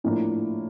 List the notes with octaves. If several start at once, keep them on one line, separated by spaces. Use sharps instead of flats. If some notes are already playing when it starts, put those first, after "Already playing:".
A2 F3 A#3 D4